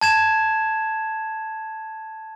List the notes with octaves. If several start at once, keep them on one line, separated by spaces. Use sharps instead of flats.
A5 G#6 E7